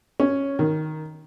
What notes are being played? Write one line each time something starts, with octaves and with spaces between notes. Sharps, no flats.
C#4
D#3